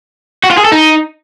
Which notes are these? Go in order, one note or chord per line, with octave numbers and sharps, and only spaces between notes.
F#4
F4
G#4
A4
D#4